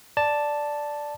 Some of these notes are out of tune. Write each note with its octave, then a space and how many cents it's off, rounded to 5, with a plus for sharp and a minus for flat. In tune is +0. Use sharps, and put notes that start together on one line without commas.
D5 +0 A5 +0